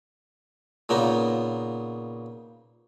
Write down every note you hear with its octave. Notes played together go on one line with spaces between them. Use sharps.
A#2 C#3 B3 D#4